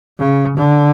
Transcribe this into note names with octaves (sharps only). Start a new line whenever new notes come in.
C#3
D3